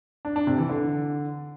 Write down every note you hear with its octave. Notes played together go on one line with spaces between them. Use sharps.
D4
D4
C3
E3
D3